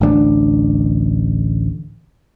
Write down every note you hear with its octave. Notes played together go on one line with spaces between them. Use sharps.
A1 D2 B3 D4